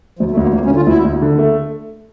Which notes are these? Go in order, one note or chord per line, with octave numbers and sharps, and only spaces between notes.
D2 F3
A3
D2
A#3
D2 A#3
C#4
D3
F4
D2 E4
D2
D3
A3